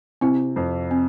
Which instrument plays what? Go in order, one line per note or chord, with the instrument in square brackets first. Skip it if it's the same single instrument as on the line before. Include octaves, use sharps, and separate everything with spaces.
[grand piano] C3 [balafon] C4 E4
[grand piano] F2
[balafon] C4